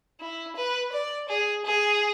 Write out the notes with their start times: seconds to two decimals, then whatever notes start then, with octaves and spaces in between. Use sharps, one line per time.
0.21 E4
0.56 B4
0.93 D5
1.29 G#4
1.65 G#4